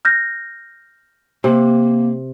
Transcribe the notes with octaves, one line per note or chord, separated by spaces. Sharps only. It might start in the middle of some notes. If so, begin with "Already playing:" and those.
F6 G6 A#6
C3 A#3